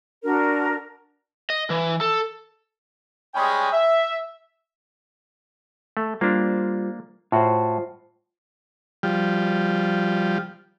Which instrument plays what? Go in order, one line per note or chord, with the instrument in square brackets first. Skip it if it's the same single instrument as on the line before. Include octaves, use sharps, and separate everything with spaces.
[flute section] D4 F#4 A#4
[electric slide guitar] D#5
E3
A4
[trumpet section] G3 G#3 C#4 G#4 G5 B5
E5
[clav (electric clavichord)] A3
[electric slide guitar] G3 F4 C5 [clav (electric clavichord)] A#3 D4
[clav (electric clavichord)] A2 F#4 [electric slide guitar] F4 C5
[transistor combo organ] F3 G3